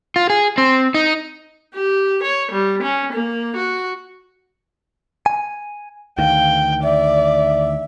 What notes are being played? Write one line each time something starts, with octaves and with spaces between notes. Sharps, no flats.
F4
G#4
C4
D#4
G4
C#5
G3
C#4
A#3
F#4
G#5
D2 D#3 F5 G5
D5 E5